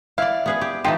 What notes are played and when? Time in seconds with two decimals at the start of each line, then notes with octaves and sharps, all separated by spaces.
0.18 E4 D5 F5
0.46 B3 G#4 B4
0.61 G4
0.84 E3 C4 D#4 F4 G4 A4